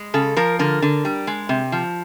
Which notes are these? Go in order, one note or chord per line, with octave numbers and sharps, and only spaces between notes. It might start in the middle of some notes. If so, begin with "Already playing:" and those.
Already playing: G#3
C#3 A4
F3 A#4
D3 A#4
D3
G3
G#3
C3
F3